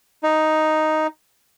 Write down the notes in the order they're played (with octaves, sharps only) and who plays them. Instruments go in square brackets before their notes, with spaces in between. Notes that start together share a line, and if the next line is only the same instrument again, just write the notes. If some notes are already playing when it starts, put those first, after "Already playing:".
[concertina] D#4